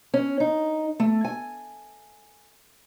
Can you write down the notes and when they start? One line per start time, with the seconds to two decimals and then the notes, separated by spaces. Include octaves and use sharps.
0.14 C#4
0.40 D#4
1.00 A3
1.25 G#5